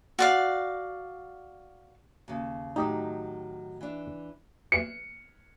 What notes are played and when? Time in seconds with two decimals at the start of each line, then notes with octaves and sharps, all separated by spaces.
0.19 F#4 D5 F5
2.28 D#2 C#3
2.76 A2 D#3 F#3 D#4 G4 D#5
3.81 E3 D4
4.72 C#7